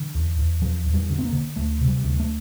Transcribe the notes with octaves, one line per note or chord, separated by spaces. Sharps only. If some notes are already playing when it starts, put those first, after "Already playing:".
Already playing: D3 E3
E2
E2
E2 F3
E2
G3
D3
C4
A#3
D3
D2 A3
C3
G3
D2
A3